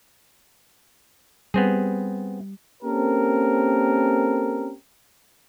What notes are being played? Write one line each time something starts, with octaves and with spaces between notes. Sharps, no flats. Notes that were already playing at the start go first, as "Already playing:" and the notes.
G3 B3 C4 G#4
A#3 C4 C#4 G4 A4 A#4